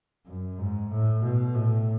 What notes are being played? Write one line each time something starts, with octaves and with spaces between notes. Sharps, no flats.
F#2
G#2
A2
B2
A2